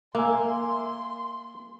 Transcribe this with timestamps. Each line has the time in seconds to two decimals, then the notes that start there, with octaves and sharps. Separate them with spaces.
0.15 A#3 E5 G#5 C6